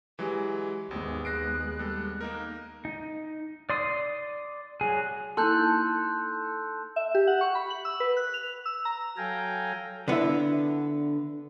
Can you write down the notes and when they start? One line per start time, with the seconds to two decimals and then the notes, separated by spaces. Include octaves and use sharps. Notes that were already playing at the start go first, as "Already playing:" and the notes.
0.19 E3 F#3 G#3 G4
0.91 G#1 D#2 G#3 B3
1.25 F#6 A#6 C7 D7
1.79 G3 A4
2.21 A#3 D#4 A#4
2.85 D#4
3.70 D5 C6 D#6
4.81 F#3 G#4
5.37 A#3 D#4 E4 A4 C6 F#6 G6
6.96 E5
7.15 G4
7.27 F#5
7.41 C#6
7.55 B5
7.70 F#7
7.85 E6
8.00 B4
8.17 F#6
8.34 F7
8.65 E6
8.85 A#5
9.17 F#3 A4 F5 G5 G#5 A#5
10.08 D3 B3 D4 E4 E5